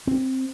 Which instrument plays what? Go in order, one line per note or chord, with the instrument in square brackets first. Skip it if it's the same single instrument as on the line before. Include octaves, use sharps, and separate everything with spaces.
[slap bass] C4